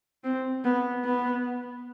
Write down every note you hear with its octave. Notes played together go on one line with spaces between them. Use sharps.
C4
B3
B3